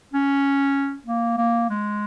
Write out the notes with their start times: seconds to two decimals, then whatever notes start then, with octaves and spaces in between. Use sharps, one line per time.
0.13 C#4
1.07 A#3
1.37 A#3
1.70 G#3